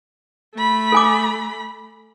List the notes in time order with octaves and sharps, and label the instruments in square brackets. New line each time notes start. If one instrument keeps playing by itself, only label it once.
[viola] A3 B5
[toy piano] A4 G#5 D6